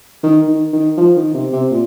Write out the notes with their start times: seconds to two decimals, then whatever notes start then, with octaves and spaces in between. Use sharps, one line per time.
0.23 D#3
0.48 D#3
0.73 D#3
0.97 F3
1.16 D#3
1.34 C3
1.53 C3
1.71 A#2